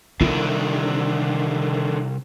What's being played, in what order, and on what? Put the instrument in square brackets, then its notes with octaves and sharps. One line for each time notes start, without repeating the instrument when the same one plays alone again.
[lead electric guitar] C2 [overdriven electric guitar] D3 D#3 [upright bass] F4